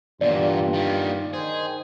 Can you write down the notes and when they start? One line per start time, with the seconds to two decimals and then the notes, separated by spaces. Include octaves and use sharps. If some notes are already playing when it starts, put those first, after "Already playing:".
0.21 E2 G2 A#2 F4 D5
0.74 D#3 G3
1.33 D#3 G#4 C5